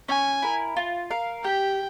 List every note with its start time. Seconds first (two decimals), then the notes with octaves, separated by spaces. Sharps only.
0.08 C#4 G#5
0.42 E4 A#4
0.77 F4
1.11 A#4 F5
1.44 G4 G5